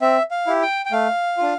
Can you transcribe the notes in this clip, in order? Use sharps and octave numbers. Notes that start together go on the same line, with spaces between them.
C4 E5
F5
E4 G4
G5
G5
A3 F5
D4 F4